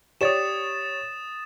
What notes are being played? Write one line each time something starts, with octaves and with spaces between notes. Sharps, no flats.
G4 C#5 D5 D#6 A6 E7